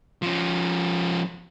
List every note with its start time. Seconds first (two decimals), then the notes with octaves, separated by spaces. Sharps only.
0.22 F3 C#4